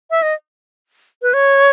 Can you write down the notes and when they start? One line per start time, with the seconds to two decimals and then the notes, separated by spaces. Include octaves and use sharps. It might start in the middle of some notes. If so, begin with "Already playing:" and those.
0.11 E5
0.22 D#5
1.22 B4
1.34 C#5